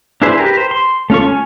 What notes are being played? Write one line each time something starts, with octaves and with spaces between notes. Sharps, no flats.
D4 E4 G#4 B4 C5
G4 A#4 B4
C5
C6
A3 C#4 F4 C#6
G#5